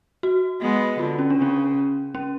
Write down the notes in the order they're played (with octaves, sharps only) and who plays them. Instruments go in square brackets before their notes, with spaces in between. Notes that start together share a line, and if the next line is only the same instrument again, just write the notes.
[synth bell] F#4
[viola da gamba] G#3 B3
[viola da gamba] D3 [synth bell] F4
[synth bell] C#4
D4
[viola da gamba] C#3 [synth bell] C#4
[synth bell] C#4